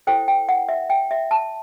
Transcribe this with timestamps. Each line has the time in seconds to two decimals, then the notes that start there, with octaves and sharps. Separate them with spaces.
0.07 E4 A4 C5 G5
0.28 G5
0.49 F#5
0.69 E5
0.90 G5
1.11 E5
1.31 A5